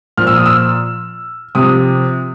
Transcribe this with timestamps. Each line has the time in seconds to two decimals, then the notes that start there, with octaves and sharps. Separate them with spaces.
0.18 A#2 F3 F6
0.27 E6
0.36 D#6
0.46 E6
1.55 C3 F3 D#6